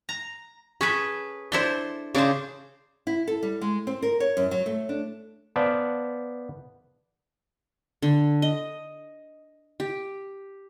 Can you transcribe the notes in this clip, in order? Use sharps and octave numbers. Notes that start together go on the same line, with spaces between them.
A#5
C#4 G#4 A4 B4
D4 E4 A4 C5 C6
C#3 D4 C5 D6
E4
A4
G3
G#3
C4
A#4
C#5
F#2
F#3
A3
D4
B3 C5 D5 F5 A5
D3
D#5
G4